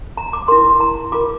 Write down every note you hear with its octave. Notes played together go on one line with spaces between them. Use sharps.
A#5
D6
E4 A#4 C6
A#5
F4 A#4 D6